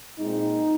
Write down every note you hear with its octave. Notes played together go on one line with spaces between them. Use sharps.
A#2 G#3 C4 D#4